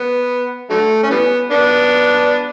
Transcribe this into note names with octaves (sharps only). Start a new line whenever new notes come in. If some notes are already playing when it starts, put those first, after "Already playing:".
Already playing: B3
D3 F#3 A3
C#4
E3 G3 B3
B3 D4